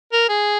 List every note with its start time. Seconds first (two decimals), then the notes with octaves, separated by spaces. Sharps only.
0.13 A#4
0.29 G#4